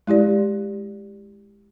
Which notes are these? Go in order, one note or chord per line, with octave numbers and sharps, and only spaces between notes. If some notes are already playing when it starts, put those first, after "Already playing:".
G#3 E4 G4 D5